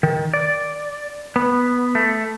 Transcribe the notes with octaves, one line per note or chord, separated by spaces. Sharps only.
D#3
D5
B3
A3